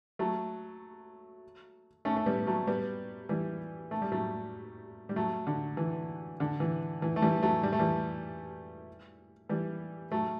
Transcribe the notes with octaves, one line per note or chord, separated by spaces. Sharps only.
F#3 A3
A3 C#4
A3
G3 B3
F#3 A3
G3 B3
E3 G3
A3
G3
F#3 A3
G3
F#3 A3
D3
E3
D3
E3
E3
A3
E3 G3
F#3 A3
G3
A3
E3 G3
E3 G3
F#3 A3